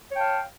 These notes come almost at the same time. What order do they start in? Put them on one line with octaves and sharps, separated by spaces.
C#5 G5 A5 F5